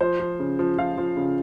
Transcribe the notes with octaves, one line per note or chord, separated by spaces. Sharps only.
F3 C5
F3
C#3
F3
F3 F5
F3
C#3